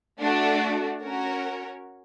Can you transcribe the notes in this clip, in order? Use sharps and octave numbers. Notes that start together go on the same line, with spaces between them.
A3 D4 F#4
C#4 F#4 A#4 C#5